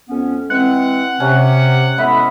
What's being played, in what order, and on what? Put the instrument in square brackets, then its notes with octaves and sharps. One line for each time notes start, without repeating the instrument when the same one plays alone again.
[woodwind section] F2 B3 C#4
[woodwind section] E3 G#3 C4 [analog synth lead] F#5
[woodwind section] C3 [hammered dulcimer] C#4
[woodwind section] A2 G#3 E5 [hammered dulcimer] B3 D#5 B5